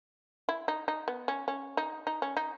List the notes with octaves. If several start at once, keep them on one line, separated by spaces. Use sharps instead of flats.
E4
D#4
D#4
B3
C#4
C#4
D#4
D#4
C#4
D#4